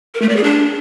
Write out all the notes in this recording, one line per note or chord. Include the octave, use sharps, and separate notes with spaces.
A#4
A3
D5
G#4
D4